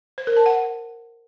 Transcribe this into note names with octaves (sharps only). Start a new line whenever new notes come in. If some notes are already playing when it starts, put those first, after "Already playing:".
C5
A#4
A5
F#5